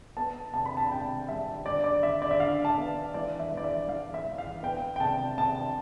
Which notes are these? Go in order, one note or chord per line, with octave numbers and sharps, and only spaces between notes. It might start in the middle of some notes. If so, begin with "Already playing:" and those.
B3 A5
C3 A5
B5
A5
C3 G5
G3 E5
D3 D5
D5
D3 E5
D5
E5
D3 F5
A5
B3
E3 D5
E5
E3
D5
E5
E3 F5
E5
E3
F5
B3 G5
G5
C3 A5
C3 A5